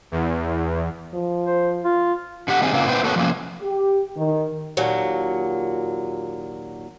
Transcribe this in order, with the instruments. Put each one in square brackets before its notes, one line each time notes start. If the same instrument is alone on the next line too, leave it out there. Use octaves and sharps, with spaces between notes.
[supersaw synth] E2
[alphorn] F3
[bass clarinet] C5
F4
[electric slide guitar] D3 G4 F#5
D#3 G3 C4 G#4
C#3 A#3 C4 F4
A#2 B3 E4 B4 C5 G5
A#3 F#4 A4 B4 C#5
F3 A#3 C#4
[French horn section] G4
D#3
[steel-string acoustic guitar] D#2 A#2 F#3